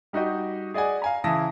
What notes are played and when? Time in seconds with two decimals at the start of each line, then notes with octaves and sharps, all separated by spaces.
0.13 G3 D#4 F#4 G4 D#5
0.74 G#4 D5 D#5 F#5 G#5
1.02 F5 G#5 A#5
1.24 C#3 E3 E4 A5 D#6 A#6